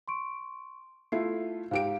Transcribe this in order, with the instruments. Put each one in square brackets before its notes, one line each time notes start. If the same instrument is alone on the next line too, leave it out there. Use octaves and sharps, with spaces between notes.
[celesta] C6 C#6 D7
[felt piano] A3 E4 F4 [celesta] C7
[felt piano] G#2 G4 D7 [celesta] F5